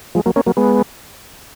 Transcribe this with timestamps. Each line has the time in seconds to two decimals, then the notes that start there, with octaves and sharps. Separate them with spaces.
0.15 F3 G#3
0.26 F#3 A#3
0.36 A#3 C#4
0.46 F#3 A#3
0.57 G#3 B3